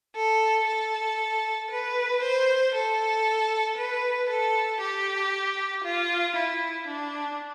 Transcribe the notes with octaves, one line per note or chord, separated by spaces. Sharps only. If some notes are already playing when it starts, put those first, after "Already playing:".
A4
A4
B4
C5
A4
B4
A4
G4
F4
E4
D4